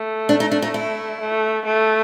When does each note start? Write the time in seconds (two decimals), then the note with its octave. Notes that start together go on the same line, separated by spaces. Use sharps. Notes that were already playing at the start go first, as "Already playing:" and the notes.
Already playing: A3
0.29 D4
0.40 D#4
0.52 D4
0.62 D#4
0.74 E4
1.20 A3
1.65 A3